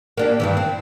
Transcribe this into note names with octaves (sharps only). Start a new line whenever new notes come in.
A#3 D4 G4
G2 D#3 E3
C4